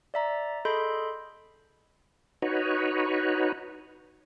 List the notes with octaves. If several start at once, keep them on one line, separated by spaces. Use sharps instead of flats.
D5 E5 A#5
G#4 A4 D#5 B5 C6 G6
D#4 F#4 B4 C#5